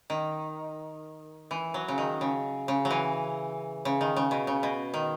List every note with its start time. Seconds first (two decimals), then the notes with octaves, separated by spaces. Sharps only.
0.10 D#3
1.51 E3
1.74 F#3
1.88 C#3
1.98 D#3
2.21 C#3
2.68 C#3
2.85 F#3
2.90 E3
3.85 C#3
4.01 D#3
4.16 C#3
4.31 B2
4.47 C#3
4.63 B2
4.94 D#3